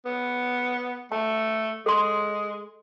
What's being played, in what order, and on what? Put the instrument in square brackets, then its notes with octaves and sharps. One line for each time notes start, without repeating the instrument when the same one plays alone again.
[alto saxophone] B3
[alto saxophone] A3 [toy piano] A5
[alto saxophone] G#3 [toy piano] A4 C6